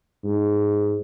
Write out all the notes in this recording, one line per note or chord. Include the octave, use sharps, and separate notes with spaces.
G#2